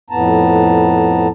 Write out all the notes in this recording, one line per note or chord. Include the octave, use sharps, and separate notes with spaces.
F2 A2 B3 A5 A#5